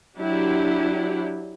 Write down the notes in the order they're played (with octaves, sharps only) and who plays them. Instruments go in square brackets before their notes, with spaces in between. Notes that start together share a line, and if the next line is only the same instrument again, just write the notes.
[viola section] F#3 D4 E4 G4